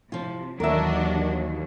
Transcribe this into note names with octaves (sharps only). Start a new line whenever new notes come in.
C3 F3 F4
D#2 E3 F#3 D4 F#4 A#4 D#5 E5